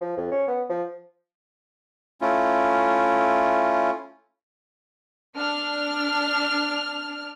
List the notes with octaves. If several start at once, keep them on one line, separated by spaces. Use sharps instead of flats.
F3
F2
C#4
B3
F3
A3 C#4 E4 F4
D4 F6